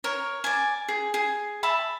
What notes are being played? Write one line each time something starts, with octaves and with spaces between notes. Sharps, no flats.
A#4 C#5
D5 G#5
G#4
G#4
E5 A5 B5